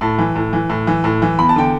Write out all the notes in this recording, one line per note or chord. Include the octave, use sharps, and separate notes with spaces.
A2 A5
E3
A2
E3
A2
E3
A2
E3
E2 B5
A5
D3 G5